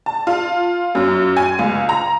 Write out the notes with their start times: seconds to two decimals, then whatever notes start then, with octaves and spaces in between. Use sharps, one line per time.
0.06 A5
0.27 F4
0.95 F#2
1.37 G#5
1.59 C#2
1.89 A#5